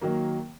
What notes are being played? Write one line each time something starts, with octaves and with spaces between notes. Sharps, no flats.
D#3 F#3 A#3